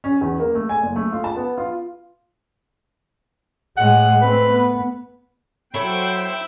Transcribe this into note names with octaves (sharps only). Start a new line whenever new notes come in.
C#4
E2
A#3
A3
G#5
F#1
A3
F4
A5
B3
F4
A2 G#3 F#5
A3 C4 B4
B3
F#3 E4 A4 C5 C#5 G5